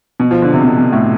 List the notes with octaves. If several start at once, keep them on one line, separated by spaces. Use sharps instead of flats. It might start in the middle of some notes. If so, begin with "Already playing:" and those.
B2
F3
D3
C3
B2
B2
A2